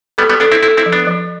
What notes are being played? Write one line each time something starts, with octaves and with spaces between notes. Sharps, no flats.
G3 B3 A4
G3 B3
B3 D4 A4
C4 E4
C4 E4 A4
C4 E4
F3
B3 D4
F3